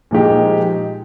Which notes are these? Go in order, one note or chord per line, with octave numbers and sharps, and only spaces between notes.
A#2 F3 G#3 D#4 G4